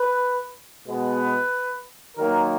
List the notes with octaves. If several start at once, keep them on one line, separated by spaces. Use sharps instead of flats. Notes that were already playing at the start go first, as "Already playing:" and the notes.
Already playing: B4
B2 G#3 B3 B4
D#3 F#3 A#3 A#4